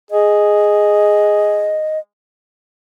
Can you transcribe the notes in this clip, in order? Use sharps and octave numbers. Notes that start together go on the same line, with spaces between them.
G#4 D#5